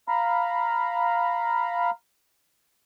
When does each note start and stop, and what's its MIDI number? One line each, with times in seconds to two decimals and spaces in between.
0.08 1.90 77
0.08 1.90 82
0.08 1.90 83